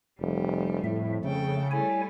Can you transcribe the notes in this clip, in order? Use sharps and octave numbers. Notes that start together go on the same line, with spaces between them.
F1 G3
F2 A2 E5
C#3 A3 A4 G5
G3 A3 E4 C#5 G#5